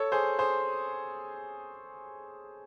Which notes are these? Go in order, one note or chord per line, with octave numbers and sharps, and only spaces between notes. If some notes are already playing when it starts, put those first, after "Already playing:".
Already playing: A4 C#5
G#4 C5
G#4 C5